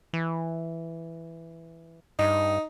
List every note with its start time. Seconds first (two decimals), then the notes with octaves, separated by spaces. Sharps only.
0.13 E3
2.19 G2 D#4